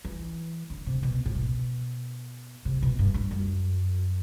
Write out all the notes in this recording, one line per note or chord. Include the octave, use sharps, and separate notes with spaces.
E3
D3
C3
B2
A2
B2
C3
B2
G2
G2
F#2